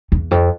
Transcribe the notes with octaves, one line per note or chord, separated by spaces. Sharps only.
E2
F2